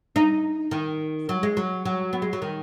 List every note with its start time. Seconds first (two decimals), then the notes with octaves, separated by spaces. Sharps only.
0.16 D#4
0.71 D#3
1.29 F#3
1.43 G#3
1.57 F#3
1.85 F#3
2.13 B3
2.22 G#3
2.33 F#3
2.42 D#3